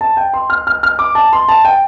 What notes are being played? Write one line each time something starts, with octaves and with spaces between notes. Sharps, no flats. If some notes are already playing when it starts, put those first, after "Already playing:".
A5
G5
C6
F6
F6
F6
D6
A5
C6
A5
G5